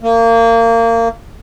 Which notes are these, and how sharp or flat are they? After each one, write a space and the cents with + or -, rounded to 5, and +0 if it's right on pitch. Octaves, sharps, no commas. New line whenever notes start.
A#3 -25